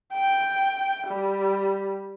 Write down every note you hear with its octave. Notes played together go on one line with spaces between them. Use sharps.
G5
G3